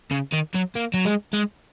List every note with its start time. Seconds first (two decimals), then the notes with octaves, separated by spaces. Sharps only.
0.11 C#3
0.32 D#3
0.54 F#3
0.75 A#3
0.94 F#3
1.05 G#3
1.33 G#3